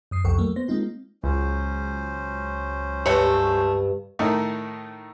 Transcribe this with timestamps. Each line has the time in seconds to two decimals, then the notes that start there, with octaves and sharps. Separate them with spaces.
0.11 F#2 D#6 C7
0.24 C2 F2 A4 F#5 G5 C#6
0.38 F#3 A3 A#3
0.56 B3 C5 A#6
0.68 G#3 A#3 C4 D#4 F4
1.24 C#2 F#3 C#4 C5
3.06 G2 A3 C#5
4.19 A2 D#3 A3 D#4